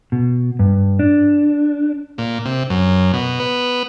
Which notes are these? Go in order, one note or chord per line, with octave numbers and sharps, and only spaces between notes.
B2
G2
D4
A#2
C3
F#2
B2
B3